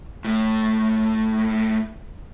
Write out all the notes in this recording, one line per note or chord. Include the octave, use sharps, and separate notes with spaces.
A2 A3